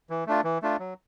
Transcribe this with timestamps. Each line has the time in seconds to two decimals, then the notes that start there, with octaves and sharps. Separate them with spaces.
0.10 E3
0.27 A3 D4 F4
0.44 E3
0.62 A3 D4 F4
0.80 F#3